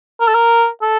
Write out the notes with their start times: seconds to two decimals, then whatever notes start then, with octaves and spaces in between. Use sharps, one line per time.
0.20 A#4
0.27 A4
0.34 A#4
0.82 A4